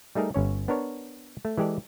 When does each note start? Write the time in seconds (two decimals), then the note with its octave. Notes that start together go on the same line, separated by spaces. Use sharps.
0.15 G3 A3 D#4 G#4 A#4
0.34 G1 C#4 C#5
0.68 B3 D4 A#4 C#5
1.45 A3
1.58 E3 G#3 G4 A4 D5